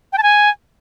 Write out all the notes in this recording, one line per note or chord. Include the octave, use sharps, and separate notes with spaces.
G5
A5
G#5